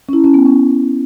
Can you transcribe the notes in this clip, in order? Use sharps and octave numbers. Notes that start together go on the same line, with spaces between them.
C#4
E4
C#4
B3
C#4